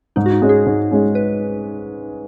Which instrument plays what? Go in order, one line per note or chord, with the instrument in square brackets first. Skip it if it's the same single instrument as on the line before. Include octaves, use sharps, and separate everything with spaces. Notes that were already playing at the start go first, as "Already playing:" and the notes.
[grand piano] G#2 [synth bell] D#4
[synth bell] F#4
D#4
[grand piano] G#3 C#4
[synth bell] G#4
[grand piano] G#2
G#3 C#4
[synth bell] B4